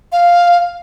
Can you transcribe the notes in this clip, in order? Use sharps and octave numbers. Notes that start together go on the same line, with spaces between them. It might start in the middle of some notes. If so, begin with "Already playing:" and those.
F5